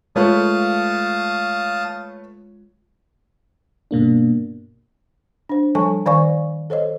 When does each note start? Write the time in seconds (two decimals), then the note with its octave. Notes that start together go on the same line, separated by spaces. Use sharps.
0.16 G#3 A3 F4 B4 C#5 F5 A5 D#6
3.91 G2 B2 A#3 D4
5.49 D4 C5
5.75 F3 G3 A4 G#5 A5 C#6
6.06 D#3 C5 D5 F5 G#5 C#6
6.70 A4 C5 C#5 D#5